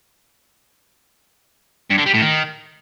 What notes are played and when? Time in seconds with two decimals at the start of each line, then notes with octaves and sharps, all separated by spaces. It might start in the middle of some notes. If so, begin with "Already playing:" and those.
1.90 G2
1.98 D3
2.06 G3
2.14 A2
2.22 D#3